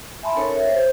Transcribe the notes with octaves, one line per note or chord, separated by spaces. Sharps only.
E5 G#5 A5 B5 C6
C#4 D#4 A4 A#4 C#5
C#5 E5
C5